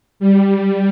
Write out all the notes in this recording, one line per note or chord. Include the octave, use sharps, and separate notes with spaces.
G3